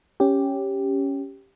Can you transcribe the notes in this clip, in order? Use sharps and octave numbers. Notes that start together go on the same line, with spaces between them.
C#4 G4